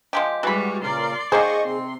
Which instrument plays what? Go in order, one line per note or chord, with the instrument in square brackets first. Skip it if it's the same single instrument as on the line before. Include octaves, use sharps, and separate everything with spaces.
[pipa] F3 G#3 G4
[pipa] E3 B5 [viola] G3 G#3 [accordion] F#4
[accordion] A#2 C#3 A#4 [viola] D5 C6
[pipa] D#3 A#3 C5 [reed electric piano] G#4 [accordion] D#5 C#6
[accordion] C3 C4 [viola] C6